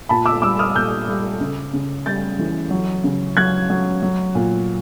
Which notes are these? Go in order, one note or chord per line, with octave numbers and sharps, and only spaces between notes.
A#2 A5 B5
D6 E6
G3 D6 E6
D#6 F6
A#2 F6 G6
G3
C#3
C#3
G3 G6 A6
E3
F#3
C#3
F#3 F#6 G#6
F#3
F#3
A#2